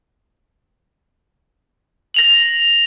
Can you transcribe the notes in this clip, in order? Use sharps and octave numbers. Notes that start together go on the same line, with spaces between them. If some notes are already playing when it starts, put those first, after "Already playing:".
A#6 F7 F#7